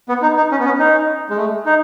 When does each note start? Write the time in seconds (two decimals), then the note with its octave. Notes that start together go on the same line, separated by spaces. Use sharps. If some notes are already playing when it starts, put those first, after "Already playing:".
0.09 B3
0.22 D#4
0.37 D#4
0.51 C#4
0.59 B3
0.65 C#4
0.79 D#4
1.30 G#3
1.37 A3
1.66 D#4